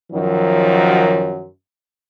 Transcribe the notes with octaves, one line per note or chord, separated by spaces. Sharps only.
F#2 D#3 F3 F#3